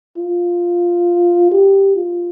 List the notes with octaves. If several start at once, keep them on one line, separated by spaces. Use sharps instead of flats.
F4
G4
F4